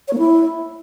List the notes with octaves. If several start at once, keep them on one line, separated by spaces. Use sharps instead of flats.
C#5
A#3
E4